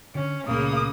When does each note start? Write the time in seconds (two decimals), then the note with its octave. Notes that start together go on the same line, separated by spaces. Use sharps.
0.15 D3 C#4
0.48 C#2 A#2 C#3 A3 A#3 D#6